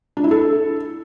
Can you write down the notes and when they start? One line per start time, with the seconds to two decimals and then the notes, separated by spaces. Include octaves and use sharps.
0.17 D4
0.24 E4
0.31 A4